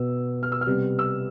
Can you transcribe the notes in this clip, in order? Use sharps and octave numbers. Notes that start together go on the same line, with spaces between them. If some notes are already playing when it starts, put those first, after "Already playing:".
Already playing: B2 B3 E6
F6
E6
F6
C3 G3 B3
E6